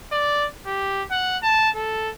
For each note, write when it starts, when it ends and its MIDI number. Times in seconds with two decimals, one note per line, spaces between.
0.12 0.47 74
0.66 1.03 67
1.11 1.38 78
1.43 1.70 81
1.75 2.11 69